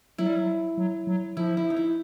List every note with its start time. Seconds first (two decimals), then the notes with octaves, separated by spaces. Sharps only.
0.18 F#3 E4
0.27 G3
0.35 F#3
0.78 F#3
1.07 F#3
1.37 F3 E4
1.57 E4
1.70 D#4
1.77 E4